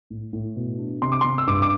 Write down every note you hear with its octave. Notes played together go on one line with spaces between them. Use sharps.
A2
A2
B2
D4
C3 C6
D6
C3 C6
E6
G2 D6
D6